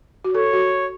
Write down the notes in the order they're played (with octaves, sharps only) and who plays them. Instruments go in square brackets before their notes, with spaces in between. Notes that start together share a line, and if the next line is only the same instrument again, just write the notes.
[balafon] F#4
[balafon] A4 [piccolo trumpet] C#5
[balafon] F#4